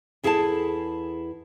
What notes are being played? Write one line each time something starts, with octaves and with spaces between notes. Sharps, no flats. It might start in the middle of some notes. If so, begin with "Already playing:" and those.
E2 E4 G#4 A4 G5 A5